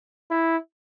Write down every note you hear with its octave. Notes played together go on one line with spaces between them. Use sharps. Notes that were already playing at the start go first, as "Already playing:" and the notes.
E4